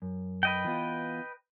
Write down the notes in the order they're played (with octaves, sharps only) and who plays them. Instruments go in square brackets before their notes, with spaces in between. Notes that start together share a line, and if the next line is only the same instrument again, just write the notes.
[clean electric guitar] F#2
[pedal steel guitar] B4 D#5 G5
[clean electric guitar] E3 B3 F4